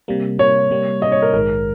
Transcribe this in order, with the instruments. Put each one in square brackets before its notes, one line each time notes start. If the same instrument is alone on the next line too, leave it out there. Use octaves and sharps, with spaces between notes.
[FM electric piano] C3 G3 A#3
[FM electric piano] C3 G3 A#3 [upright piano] C#5
[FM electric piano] C3 G3 A#3
[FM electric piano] C3 G3 A#3 [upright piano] D#5
[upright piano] C#5
A#4
[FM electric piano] A#1 G#2 D#3 G#3 [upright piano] A#4